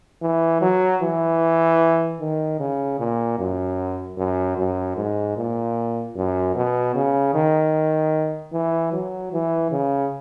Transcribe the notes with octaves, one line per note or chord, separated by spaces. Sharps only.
E3
F#3
E3
D#3
C#3
A#2
F#2
F#2
F#2
G#2
A#2
F#2
B2
C#3
D#3
E3
F#3
E3
C#3